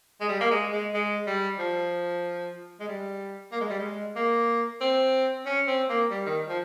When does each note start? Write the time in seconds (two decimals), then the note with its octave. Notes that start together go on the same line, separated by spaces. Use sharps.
0.21 G#3
0.29 G3
0.41 A#3
0.51 G#3
0.72 G#3
0.94 G#3
1.27 G3
1.59 F3
2.80 G#3
2.88 G3
3.52 A#3
3.61 G#3
3.70 G3
3.79 G#3
4.16 A#3
4.81 C4
5.46 C#4
5.67 C4
5.89 A#3
6.11 G3
6.26 D#3
6.48 F3